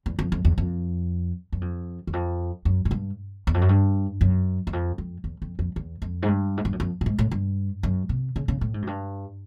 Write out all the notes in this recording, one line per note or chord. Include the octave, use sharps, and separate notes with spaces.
E2
F2
F2
E2
F2
F#2
F2
E2
F2
F#2
G#2
G2
E2
F2
F#2
G2
F#2
E2
F2
F2
E2
F2
F2
E2
F2
G#2
G2
G#2
G2
F#2
F2
A2
G#2
A2
G2
F#2
C3
C#3
C#3
A2
G#2
F#2
G2